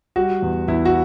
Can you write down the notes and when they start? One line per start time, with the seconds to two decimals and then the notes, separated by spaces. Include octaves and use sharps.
0.16 G3 F#4
0.42 E2
0.68 E2 E4
0.85 F#4